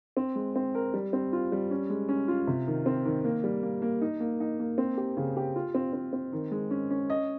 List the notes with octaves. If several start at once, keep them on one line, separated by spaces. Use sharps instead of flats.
C4
G#3
C4
A#4
G3
C4
F4
G3
C#4
G#3
C#4
F4
C3
D#3
C4
D#3
A#3
G3
A#3
A#3
D#4
A#3
D#4
A#3
C4
G4
C#3
G4
F4
C4
C4
C4
D#3
G#3
C#4
C#4
D#5